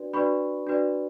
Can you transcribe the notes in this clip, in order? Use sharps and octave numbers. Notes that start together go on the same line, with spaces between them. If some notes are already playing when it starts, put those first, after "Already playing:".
Already playing: D4 F#4 B4 D5
D4 F#4 B4 D5 B5 C#6
D4 F#4 B4 D5